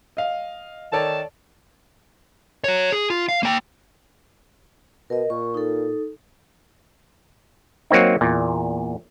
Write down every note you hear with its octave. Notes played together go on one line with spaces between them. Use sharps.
D#5 F5
D#3 A4 C#5 D5 A5
F#4 C#5
G#4
F4
F5
A#3 G5
B2 A#4 D#5
A#2 C#6
D#4 A4
F#3 A#3 C4 D#4
E2 A#2